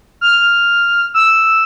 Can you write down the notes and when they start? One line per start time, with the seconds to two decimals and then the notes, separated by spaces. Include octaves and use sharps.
0.21 F6
1.14 E6